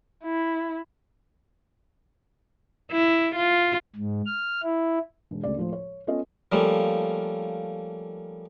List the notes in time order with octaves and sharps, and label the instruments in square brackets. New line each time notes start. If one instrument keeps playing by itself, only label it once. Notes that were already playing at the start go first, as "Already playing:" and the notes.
[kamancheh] E4
[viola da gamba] E4
F4
[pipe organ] G#2
F6
E4
[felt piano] E1
D2 C#3 D5
A2 F3 C5
C#5
B3 C#4 F4 A4 D#5
[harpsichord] F3 G3 A3 A#3 C#4